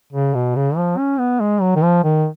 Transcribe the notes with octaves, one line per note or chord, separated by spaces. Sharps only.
C#3
B2
C#3
F3
C#4
B3
G#3
F#3
D#3
F3
D#3